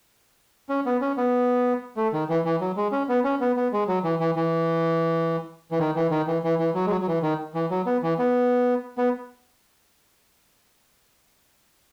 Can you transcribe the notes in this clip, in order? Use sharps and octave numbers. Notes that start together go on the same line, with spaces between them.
C#4
B3
C#4
B3
A3
D#3
E3
E3
F#3
G#3
C#4
B3
C#4
B3
B3
G#3
F#3
E3
E3
E3
E3
D#3
E3
D#3
E3
E3
E3
F#3
G#3
F#3
F#3
E3
D#3
E3
F#3
B3
E3
B3
B3